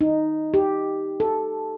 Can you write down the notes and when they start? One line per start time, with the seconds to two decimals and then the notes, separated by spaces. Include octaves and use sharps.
0.01 D#4
0.54 G4
1.20 A4